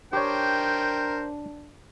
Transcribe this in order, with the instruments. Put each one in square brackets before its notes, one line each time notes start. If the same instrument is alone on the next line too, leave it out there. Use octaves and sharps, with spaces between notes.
[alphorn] D4 [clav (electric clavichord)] G4 C#5 [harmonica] A#4 G5 [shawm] C5